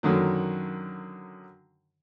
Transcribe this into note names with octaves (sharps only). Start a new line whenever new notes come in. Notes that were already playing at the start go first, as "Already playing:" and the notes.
F#2 D3 D#3 F#3